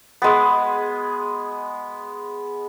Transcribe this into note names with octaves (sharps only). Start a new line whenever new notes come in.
G#3 B3